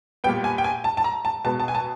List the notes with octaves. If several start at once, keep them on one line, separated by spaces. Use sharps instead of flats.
A#2 G3 B3 G5
G#5
G5
G#5
A5
A5
A#5
A5
B2 G#3 B3 A5
A5
G#5
A5